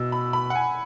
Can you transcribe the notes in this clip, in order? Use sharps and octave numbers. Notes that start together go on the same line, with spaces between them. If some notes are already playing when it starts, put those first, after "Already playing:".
Already playing: B2 E6
B5
B5
F#5
G#5